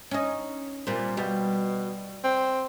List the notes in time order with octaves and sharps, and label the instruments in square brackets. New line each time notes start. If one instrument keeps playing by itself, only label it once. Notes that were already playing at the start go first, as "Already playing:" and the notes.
[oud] C#4 D#4
[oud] A#2 G3 [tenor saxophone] C4
[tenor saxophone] B2 [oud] G3
[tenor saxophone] C4